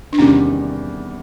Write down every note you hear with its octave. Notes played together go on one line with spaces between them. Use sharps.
D4
E2 C3 D#3 G3 C#4